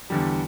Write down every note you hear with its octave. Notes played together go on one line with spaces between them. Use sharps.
E2 D3 G3